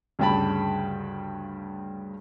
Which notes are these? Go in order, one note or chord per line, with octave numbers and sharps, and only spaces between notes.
D2 G2 C#3 G5 A5 B5